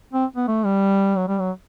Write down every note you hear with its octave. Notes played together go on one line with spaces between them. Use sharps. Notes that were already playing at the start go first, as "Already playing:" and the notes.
C4
B3
A3
G3
F#3
G3
F#3